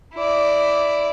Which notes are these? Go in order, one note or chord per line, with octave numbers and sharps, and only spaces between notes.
E4 D5